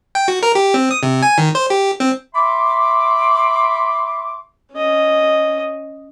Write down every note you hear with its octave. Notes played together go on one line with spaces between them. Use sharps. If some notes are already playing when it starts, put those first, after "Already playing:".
G5
F#4
A#4
G4
C4
D#6
C3
G#5
D#3
C5
G4
C4
E5 B5 C6 D6
C#4 D#5